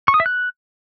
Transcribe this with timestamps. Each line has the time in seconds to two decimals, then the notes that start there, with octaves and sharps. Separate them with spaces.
0.08 C#6
0.14 D#6
0.20 E5
0.26 F#6